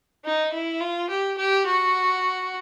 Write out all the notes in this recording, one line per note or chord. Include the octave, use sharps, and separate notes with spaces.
D#4
E4
F4
G4
G4
F#4